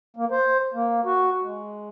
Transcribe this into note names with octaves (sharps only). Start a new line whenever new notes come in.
A#3
C5
A#3
F#4
G#3